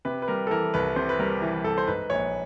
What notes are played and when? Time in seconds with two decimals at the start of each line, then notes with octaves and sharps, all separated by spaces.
0.05 C3 B4
0.22 B4
0.28 G3 A#4
0.47 A4
0.50 E3 A#4
0.74 C2 B4
0.96 C3 C5
1.09 B4
1.19 G3 A#4
1.42 E3
1.64 C2 A4
1.78 C5
1.87 G#2 B4
2.10 A#1 C#5